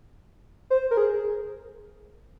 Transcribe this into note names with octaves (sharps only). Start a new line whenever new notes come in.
C5
A#4
G#4